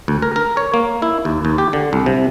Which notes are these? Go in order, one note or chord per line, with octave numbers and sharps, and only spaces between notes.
D2
A#4
A#4
C#5
A#3
E4
D#2
D#2
G4
D3
C2
C3